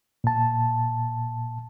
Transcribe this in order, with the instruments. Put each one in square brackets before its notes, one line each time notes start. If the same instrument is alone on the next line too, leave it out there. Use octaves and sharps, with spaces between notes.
[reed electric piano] A#2 A5